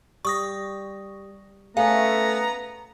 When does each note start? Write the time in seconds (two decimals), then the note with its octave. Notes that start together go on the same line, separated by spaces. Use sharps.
0.25 G3 C#6 D#6 A#6
1.77 A3 B3 C#4 G#4 F5 A#5